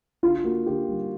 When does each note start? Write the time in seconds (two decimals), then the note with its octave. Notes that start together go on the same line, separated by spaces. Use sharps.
0.23 D3 F4
0.44 A#3 F#4
0.66 D3 G4
0.89 G3